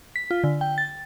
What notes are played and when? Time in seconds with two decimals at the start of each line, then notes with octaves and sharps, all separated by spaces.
0.16 B6
0.31 F4
0.44 D3
0.61 G5
0.78 A6